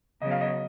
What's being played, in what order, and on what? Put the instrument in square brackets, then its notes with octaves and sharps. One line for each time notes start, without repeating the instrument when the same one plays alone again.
[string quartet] C#3 F#3 B3 [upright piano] D#5
[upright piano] F5
D#5